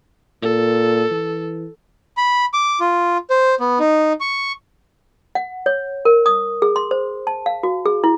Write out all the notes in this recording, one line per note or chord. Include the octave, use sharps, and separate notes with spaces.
A#2 A4
E3
B5
D6
F4
C5
B3
D#4
C#6
F#5
C#5
A#4
D#6
G#4
C6
C5
A5
F5
F#4
G#4
E4